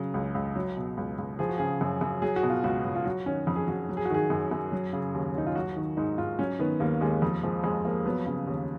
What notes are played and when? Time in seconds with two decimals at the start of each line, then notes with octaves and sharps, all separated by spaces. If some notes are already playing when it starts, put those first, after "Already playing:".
Already playing: C#3 F#3
0.14 C#2
0.35 C#2
0.55 F#3
0.76 B2
0.97 C#2
1.18 C#2
1.39 F3 G#4
1.49 F#4
1.58 C#3 G#4
1.81 F#2
2.01 F#2
2.22 F#3 G#4
2.36 F#4
2.43 B2
2.50 F4
2.64 C#2 F#4
2.85 C#2
2.95 F4
3.05 F#3 F#4
3.26 D#3 C#4
3.47 F2
3.56 G#4
3.68 F2 F#4
3.89 F#3
3.97 G#4
4.05 F#4
4.10 D#3 G#4
4.30 F#2
4.51 F#2
4.72 F#3
4.93 C#3
5.14 D#2
5.35 D#2 D#4
5.46 F4
5.55 F#3 F#4
5.76 D#3
5.97 G#2 D#4
6.18 G#2 F4
6.39 F#3 C#4
6.59 D#3 B3
6.80 D#2 A#3
7.01 D#2 G#3
7.22 F2
7.43 F3 G#3
7.63 F2 G#3
7.85 F3 A#3
8.06 F#3 B3
8.26 C#3
8.47 D#2